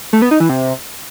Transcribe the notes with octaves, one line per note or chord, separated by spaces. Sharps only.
A3
B3
D#4
E3
C3